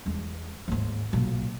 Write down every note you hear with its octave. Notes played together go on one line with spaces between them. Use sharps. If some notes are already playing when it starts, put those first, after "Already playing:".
E2 G#3
D#2 G#2
B1 A#2